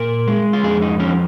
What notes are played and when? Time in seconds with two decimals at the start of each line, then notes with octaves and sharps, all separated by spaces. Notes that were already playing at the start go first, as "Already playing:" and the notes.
Already playing: A#2 A#4
0.28 G#3
0.53 F4
0.63 F2 G#4
0.82 D#4
1.00 F3 C#4